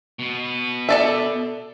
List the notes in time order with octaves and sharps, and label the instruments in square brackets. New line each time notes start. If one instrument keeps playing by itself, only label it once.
[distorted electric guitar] B2 B3
[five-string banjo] A4 D5 E5